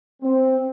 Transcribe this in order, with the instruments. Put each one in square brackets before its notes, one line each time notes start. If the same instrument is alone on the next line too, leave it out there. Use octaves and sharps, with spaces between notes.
[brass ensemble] C4